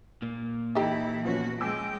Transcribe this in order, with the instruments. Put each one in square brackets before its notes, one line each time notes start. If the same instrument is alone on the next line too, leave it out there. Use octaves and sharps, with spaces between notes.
[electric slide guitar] A#2 A#3
[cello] E3 E4 [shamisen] D#4 G4 A4
[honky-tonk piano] F3 B3 C#4 [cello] F#4
[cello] G#3 G5 [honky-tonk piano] G#5 D6 E6